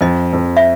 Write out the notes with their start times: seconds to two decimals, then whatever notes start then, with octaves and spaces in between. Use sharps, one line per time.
0.01 F2 D#5
0.33 F2
0.57 E5